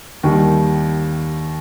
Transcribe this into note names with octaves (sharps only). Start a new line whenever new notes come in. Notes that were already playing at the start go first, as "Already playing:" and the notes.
D#2 D#3 G3